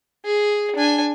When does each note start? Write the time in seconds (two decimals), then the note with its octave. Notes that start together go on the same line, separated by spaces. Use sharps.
0.25 G#4
0.76 D4 G#5